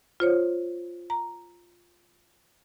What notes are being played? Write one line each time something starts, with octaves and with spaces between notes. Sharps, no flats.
F4 C5 C#5
A#5